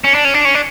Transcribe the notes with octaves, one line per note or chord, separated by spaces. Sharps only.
C#4
D4
C#4
D4
C#4
D4